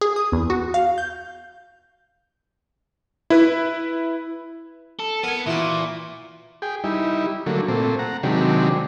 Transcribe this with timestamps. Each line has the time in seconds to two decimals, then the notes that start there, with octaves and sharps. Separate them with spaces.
0.01 G#4
0.16 D#6
0.32 E2
0.50 F#4
0.74 F5
0.98 G6
3.30 E4 B4
4.99 A4
5.23 B3 A#4 G#5
5.46 A#2 E3 F#4
6.62 G#4 G5
6.84 G3 D#4 E4
7.46 D3 F#3 A3 A#3
7.68 A#2 A3 C4
7.99 F#5 A#5
8.23 C3 D#3 F#3 G#3 D4 G4